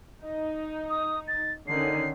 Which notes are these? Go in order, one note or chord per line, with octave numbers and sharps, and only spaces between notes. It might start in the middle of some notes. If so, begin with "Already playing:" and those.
D#4 D#5
D#6
A6
D3 D#3 C#4 C7